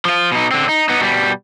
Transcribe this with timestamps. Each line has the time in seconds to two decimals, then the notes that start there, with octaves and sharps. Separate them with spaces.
0.05 F3 F4
0.32 B2 D#4
0.51 D3 C4
0.69 D#4
0.89 B3 D#4
1.01 B2 G3